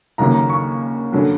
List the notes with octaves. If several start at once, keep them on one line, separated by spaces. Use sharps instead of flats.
D#2 C#3 F#3 A#3 C#4 A#5
A#5
C#6
G2 D3 F#3 A#3 C#4